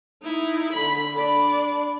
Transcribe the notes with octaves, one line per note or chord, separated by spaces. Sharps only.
D#4 E4
D3 B5
D4 D5 B5